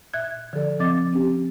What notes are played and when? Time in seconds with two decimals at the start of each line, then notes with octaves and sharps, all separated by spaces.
0.14 A#2 E5 F#6 G#6
0.53 D3 F3 A4 D5
0.79 C#3 F3 C4 D#5 D6 A6
1.12 C4 C#4 G4